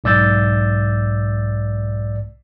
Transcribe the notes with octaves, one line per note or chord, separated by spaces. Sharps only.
B1 G#2 D5 E6 G6 A6